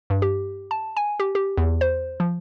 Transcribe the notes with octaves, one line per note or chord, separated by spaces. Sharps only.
G2
G4
A5
G#5
G4
G4
E2
C5
F3